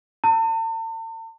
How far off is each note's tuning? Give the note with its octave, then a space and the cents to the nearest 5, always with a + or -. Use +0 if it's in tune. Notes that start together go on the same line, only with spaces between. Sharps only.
A5 +45